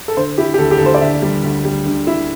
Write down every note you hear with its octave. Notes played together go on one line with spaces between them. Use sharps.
A4
D3 C5
E4 G4
G4
D2 A4
G4
A4
D2
C5
D5
D2 E5
G3
D2
G3
D3
E4